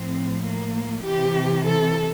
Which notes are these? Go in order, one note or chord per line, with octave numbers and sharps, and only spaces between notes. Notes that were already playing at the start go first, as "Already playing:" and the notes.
Already playing: A2 F3 C4
A#3
C3 E3 G4
A4